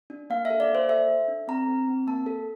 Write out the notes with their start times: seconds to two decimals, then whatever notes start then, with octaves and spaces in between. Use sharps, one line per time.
0.10 D4
0.30 A#3 F5
0.45 E5
0.50 A4
0.60 D5
0.70 A#3 C5
0.89 A4 E5
1.09 A4
1.28 D4
1.48 C4 A#5
1.68 C4
1.88 C4
2.07 A#3 A5
2.26 A4